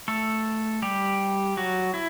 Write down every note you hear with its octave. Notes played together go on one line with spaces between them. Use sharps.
A3 A4
G3 G4
F#3 F#4
E4